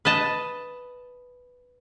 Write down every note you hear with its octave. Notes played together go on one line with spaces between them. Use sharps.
B4 D#5 A5